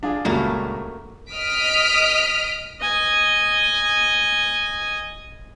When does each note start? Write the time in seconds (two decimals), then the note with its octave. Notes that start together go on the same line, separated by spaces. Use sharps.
0.03 D4 F4 G#4
0.25 C#2 G2 A#2 A3 A#3 F#4
1.31 D#5 D#6 F6 B6 D7
2.81 D#5 G#5